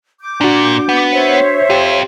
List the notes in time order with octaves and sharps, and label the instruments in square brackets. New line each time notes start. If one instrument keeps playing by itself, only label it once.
[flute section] D6 G6
[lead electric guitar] A#2 [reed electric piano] D4 F#4
[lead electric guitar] B3
[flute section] C5 C#5 E5
[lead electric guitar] C4 F4 [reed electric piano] G4